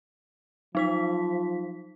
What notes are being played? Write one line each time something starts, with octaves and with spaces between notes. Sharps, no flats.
F3 F#3 D#4 B6